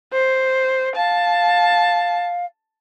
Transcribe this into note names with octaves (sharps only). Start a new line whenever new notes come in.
C5
F5 A5